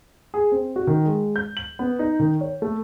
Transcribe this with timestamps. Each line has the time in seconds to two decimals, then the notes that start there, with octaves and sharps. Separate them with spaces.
0.34 G#4
0.52 C4
0.76 F#4
0.87 D#3
1.05 G#3
1.36 G6
1.57 F#7
1.79 B3
1.99 D#4
2.20 D#3
2.41 C#5
2.62 A3